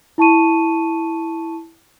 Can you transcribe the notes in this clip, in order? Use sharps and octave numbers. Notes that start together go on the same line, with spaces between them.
E4 A5 C#6 D#7